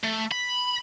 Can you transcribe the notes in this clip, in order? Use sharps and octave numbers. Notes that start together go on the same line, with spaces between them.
A3
B5